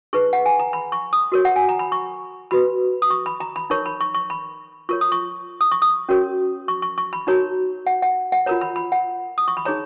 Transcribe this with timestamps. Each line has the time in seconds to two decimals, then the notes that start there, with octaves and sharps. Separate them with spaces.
0.13 D#4 G#4 B4 C#6
0.33 F#5
0.46 G#5
0.59 A#5
0.73 B5
0.92 C#6
1.13 D#6
1.32 F#4 A#4 C#5
1.45 F#5
1.56 G#5
1.69 A#5
1.79 B5
1.92 C#6
2.51 F#4 B4 B5
3.02 D#6
3.10 C#6
3.26 B5
3.40 A#5
3.56 B5
3.70 D#4 A#4 C#5 C#6
3.86 B5
4.01 C#6
4.14 C#6
4.30 B5
4.89 F4 A#4 C#5 C#6
5.01 D#6
5.12 C#6
5.61 D#6
5.72 C#6
5.82 D#6
6.09 C#4 F#4 A#4 C#5
6.68 C#6
6.82 C#6
6.98 C#6
7.13 B5
7.27 D#4 F#4 A#4 C#5 A#5
7.87 F#5
8.02 F#5
8.32 F#5
8.46 F4 A#4 C#5 A#5
8.61 B5
8.76 B5
8.92 F#5
9.38 D#6
9.48 C#6
9.57 B5
9.65 D#4 G#4 C#5 A#5